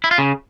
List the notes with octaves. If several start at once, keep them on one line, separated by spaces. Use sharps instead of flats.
E4
F4
C#3